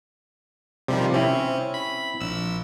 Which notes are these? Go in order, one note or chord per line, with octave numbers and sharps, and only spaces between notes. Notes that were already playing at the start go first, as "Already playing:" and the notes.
C3 D#3 F3 G3
C4 C#4 E4
B5
A#1 E6